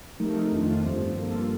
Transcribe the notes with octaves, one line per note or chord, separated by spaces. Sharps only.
C3 F3 A3 D#4 A#4
F2 D#3 A3 D4 F4
G1 G2 F3 C4
G2 F3 A#3 F4 A4